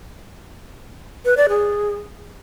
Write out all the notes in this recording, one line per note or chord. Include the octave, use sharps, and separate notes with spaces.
B4
D5
G#4